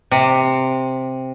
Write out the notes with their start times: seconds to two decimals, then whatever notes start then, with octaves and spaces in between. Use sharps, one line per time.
0.11 C3